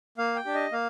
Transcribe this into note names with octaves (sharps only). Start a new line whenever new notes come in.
A#3 F5
G5
D4 G4
D#5
A#3 F5